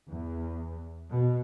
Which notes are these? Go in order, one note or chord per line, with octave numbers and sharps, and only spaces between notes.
E2
B2